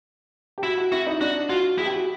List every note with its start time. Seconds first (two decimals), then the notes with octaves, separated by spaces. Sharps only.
0.58 G4
0.63 E4 F#4
0.78 F#4
0.92 E4 F#4
1.07 D#4
1.21 D4 F#4
1.49 F4 F#4
1.78 E4 G#4
1.86 G4
1.94 F#4